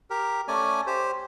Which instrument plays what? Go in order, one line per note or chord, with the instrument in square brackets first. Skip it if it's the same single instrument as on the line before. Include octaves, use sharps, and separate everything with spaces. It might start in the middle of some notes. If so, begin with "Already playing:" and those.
[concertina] G4 A#4
A3 C#4 D5 G#5
G4 C5